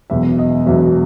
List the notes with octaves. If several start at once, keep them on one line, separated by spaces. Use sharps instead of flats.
E1 E2 B2 F#3 E5
D#5
E1 E2 B2 F#3 E5